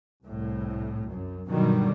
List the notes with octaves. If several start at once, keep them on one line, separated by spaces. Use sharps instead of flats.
C2 A2
F#2
G2 B2 D3 D#3 F#3 G3